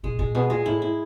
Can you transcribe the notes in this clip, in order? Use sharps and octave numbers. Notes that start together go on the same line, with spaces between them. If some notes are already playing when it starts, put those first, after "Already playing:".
A#2 G#3
A#2 G#3
B2 G#3
A#2 G#3
A2 E4
E4